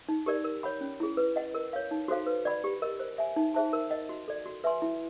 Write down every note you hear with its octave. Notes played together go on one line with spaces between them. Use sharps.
D#4
G4 A#4 D5
A#4
C#5 F#5 B5
C#4
E4 G#4
B4
D#5 F#5
A#4
C#5 F5
D#4
F#4 A4 C5 F5
B4
D5 F#5 B5
G4
A#4 D#5
C5
E5 G#5
D#4
G#4 C5 E5 A5
A#4
D#5 F#5
F#4
A4 D5
F#4
B4 E5 G#5 C6
E4